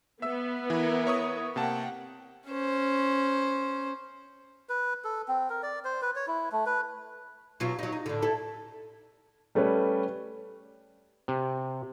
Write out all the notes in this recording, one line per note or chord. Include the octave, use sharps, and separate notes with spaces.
B3 B4 E5 E6
E3 E4 A#4
C#5 C#6 D#6
C3 A#3 F#5 G5 A5
C#4 C5
B4
A4
C4
A#4
D5
C5
B4
C#5
E4
A3
B4
B2 F#3 F4
F#3 D#4
D#4
A2 D3
E4 A4
G3 A3 C#4 B4
C3